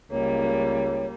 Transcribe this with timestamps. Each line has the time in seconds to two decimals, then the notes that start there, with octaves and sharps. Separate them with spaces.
0.11 C#2 G3 A#3 C#5